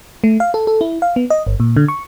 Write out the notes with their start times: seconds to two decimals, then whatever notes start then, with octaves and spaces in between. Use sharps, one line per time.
0.24 A3
0.40 F5
0.54 A4
0.67 A4
0.81 E4
1.02 F5
1.16 B3
1.30 D#5
1.47 G1
1.60 A#2
1.76 D3
1.88 C#6